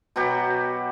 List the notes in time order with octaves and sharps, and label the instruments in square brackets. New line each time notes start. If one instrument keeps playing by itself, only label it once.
[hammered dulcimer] B2 F#3 F#4 G4